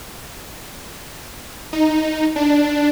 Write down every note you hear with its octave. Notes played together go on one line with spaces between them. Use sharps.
D#4
D4